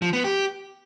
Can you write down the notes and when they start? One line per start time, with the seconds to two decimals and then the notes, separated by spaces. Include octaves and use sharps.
0.02 F3
0.13 B3
0.24 G4